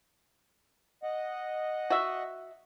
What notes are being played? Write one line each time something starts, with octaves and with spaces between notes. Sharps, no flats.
D#5 F#5
F#4 E5